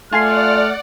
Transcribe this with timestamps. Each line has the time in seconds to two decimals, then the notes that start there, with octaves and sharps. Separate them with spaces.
0.13 A3 F4 D5 F#5 G#5 C6 F6